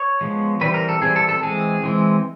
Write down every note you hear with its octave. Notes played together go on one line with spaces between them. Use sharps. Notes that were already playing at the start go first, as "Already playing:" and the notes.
Already playing: C#5
F3 G#3 B3
E3 G3 C4 B4
A#4
A4
E3 G3 C4 G#4
A4
A4
E3 G#3 C4 G#4
E3 G#3 C4